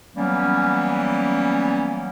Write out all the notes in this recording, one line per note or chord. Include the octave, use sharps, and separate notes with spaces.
E3 F#3 G3 A#3 B3 C#4